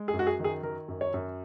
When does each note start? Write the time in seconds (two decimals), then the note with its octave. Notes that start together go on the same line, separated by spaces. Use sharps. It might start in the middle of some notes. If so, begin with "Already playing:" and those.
Already playing: G#3
0.08 G#4
0.13 F#2
0.19 F#4
0.27 G#4
0.39 D#3 G#4
0.63 D#3 A#4
0.88 F#2
1.01 C#5
1.14 F#2